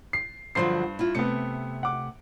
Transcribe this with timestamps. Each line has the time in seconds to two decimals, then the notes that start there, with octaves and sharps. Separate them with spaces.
0.13 C7
0.55 G2 D3 F3 F#3 C5 C7
0.99 E4 F4
1.15 C3 A3 B3 C#7
1.83 F#5 D6